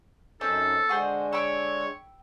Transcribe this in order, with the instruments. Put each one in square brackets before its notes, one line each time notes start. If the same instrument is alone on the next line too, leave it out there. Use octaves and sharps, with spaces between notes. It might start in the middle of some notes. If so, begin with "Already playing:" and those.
[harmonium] F#2 D#4 [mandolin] C4 C#4 [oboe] A4
[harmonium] D3 G#3 [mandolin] F#4 G#4 C5
[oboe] C#5 [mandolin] G5 B5 E6